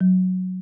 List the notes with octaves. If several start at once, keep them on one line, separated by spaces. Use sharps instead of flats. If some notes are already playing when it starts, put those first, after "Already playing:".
F#3